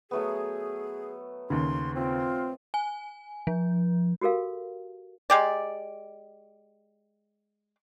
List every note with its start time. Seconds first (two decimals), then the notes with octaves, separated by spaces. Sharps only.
0.11 F#3 A3 B3 G#4
1.50 D#2 C#3 C6
1.95 C4 F4
2.74 G#5
3.47 F3
4.21 F#4 G4 A4 A#4 F5
5.30 G#3 G4 D5